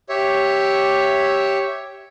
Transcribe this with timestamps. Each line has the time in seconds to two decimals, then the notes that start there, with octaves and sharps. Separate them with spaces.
0.09 G4 C#5 E5